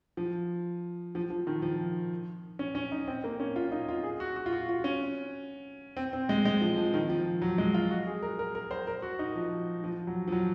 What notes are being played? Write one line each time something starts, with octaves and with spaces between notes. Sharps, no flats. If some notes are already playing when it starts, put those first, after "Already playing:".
F3
F3
F3
D#3
F3
C#4
C#4
D#4
C4
A#3
C#4
F4
D#4
F4
G#4
F#4
F#4
F4
F#4
F4
C#4
C4
C4
G#3
G#3
F3
F3
D#3
F3
F#3
G#3
F4
F#4
G#4
A#4
A#4
A#4
C5
A#4
F#4
D#4
F3
F3
F#3
F3
F#3